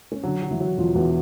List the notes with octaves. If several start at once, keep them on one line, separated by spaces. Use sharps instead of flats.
C#4
D3 F#3 D4
F#3
E3 E4
F#3
E1 F3 F4
E2 F#3 F#4